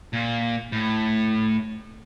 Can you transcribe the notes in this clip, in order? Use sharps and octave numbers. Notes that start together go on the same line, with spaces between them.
A#2
A2